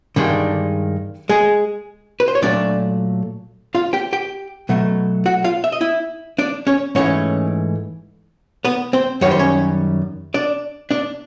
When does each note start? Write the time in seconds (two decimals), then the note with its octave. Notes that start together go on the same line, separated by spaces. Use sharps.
0.16 G2 D3 D#3 G#3 D4
1.29 G#3 G#4
2.20 B4
2.28 C5
2.35 C#5
2.42 A#2 F#3 A3 D4 D5
3.75 F4 F5
3.93 G4 G5
4.13 G4 G5
4.69 B2 F#3 A3
5.26 F#4 F#5
5.44 F4 F5
5.64 E5
5.72 D#5
5.81 E4 E5
6.39 D4 D5
6.67 C#4 C#5
6.95 G#2 E3 A3 C#4 C#5
8.65 B3 B4
8.93 C4 C5
9.21 F#2 D#3 G3 C#5
9.31 C5
9.39 C#4 C#5
10.34 D4 D5
10.91 D4 D5